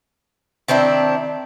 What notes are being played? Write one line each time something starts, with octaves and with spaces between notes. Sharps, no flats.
D#3 C4 D4 E4